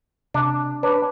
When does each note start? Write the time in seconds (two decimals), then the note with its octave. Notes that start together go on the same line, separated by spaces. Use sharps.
0.34 C3 D4
0.83 D4 B4 C#5 B5